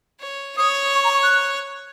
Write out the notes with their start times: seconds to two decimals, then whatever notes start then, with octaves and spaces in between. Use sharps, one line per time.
0.20 C#5
0.57 C#5 D#6
0.95 C#6
1.04 A#5
1.14 C#6
1.23 F#6